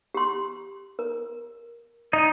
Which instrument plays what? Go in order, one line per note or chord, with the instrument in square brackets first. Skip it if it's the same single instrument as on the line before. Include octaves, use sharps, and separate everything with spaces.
[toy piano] G4 C6
A#4
[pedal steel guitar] D#4 D#5